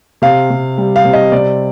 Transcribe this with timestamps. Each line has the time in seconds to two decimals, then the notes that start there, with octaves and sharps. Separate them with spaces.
0.22 C3 F5
0.50 C3
0.78 G3
0.96 F5
1.05 C3
1.13 D#5
1.32 C3 D5